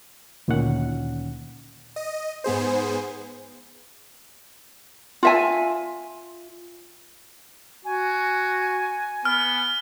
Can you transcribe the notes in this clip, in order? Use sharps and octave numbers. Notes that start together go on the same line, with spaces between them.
D2 A#2 D#3 C#4 F#5
D#5
G#2 B3 G#4 C5
F4 E5 G#5
F#4 G#5
B3 F6